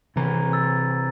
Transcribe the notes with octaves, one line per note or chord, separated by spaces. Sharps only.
C3 E3 A#5
E6 A6
A#5